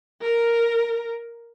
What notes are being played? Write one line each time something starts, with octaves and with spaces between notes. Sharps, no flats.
A#4